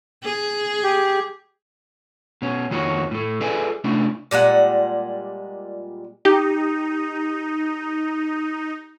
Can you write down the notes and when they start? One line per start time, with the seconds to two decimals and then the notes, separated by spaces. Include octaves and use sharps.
0.24 G#4
0.83 G4
2.42 B2 C#4
2.71 F2 D#3 A#3 F#4 C#5
3.11 A2 A3
3.41 G#4 A4 B4 D5 E5 G#5
3.84 C3 A3 C#4 D4 E4
4.31 A#2 G3 G#3 F#5
6.25 D#4 G4